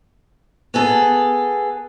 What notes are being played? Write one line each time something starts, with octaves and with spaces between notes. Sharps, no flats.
B3 G#4 A4